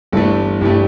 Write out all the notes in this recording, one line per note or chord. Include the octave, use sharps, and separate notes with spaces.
G1 G2 E3 A3 A4
G1 G2 E3 A3 G4